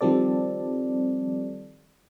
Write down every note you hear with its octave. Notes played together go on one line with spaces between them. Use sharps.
D#3 F3 G3 C4 A4 D5